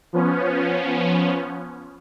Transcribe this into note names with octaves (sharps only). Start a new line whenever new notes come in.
F3 B3 C#4